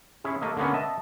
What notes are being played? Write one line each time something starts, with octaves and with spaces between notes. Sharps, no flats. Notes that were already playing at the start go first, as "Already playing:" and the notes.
C#4 E4 G#4
A3 A#3 D#5 E5
D3 A#3 B3 C#4
D#5 E5 A5